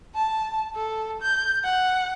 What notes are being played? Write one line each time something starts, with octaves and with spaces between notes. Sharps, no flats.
A5
A4
G6
F#5